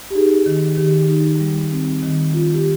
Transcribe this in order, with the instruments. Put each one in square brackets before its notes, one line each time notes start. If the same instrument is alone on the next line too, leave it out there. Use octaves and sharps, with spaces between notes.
[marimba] G4
D#4 G#4
D#3
D#3 G4
D#4
G3
C4
D#3
F4
G4